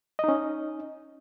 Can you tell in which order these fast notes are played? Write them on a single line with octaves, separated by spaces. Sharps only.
D#5 D#4 C#4